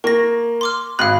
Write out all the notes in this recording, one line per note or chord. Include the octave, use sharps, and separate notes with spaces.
A#3 C#6 A#6
C6 D6 F6
G#1 F5 B5 F#6